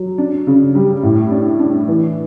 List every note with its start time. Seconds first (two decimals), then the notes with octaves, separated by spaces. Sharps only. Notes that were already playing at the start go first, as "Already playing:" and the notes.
Already playing: F#3
0.18 D4
0.47 C#3
0.75 G3
1.03 A2
1.31 D4
1.59 D4
1.88 E3